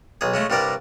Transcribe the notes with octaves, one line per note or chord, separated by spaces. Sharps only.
B1 G#4
C#3 G#3 A3
C2 G2 G3 A#4 D5